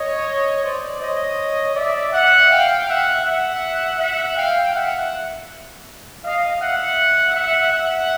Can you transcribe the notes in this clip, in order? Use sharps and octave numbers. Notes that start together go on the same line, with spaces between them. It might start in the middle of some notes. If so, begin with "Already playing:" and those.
Already playing: C#5 D#5
C5 D5
C#5 D#5
D5 E5
E5 F#5
F5 G5
E5 F#5
E5 F#5
E5 F#5
F5 G5
E5 F#5
D#5 F5
E5 F#5
E5 F#5
E5 F#5